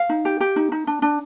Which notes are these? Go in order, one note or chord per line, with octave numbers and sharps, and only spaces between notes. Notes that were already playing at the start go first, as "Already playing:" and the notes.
Already playing: F5
D#4
G4
G4
D#4
D#4
D4
D4